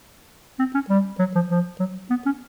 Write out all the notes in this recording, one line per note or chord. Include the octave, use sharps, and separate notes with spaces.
C4
C#4
G3
F#3
F3
F3
F#3
B3
C#4